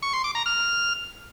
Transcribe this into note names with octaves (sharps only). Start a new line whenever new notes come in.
C#6
C6
D6
A#5
F6